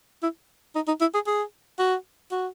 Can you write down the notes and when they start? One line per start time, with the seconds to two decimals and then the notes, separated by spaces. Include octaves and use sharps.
0.23 E4
0.75 D#4
0.88 D#4
1.01 E4
1.14 G#4
1.27 G#4
1.79 F#4
2.31 F#4